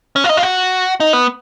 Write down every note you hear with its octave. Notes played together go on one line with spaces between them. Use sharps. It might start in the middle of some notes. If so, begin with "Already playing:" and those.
C#4
F4
D#4
F4
F#4
D#4
B3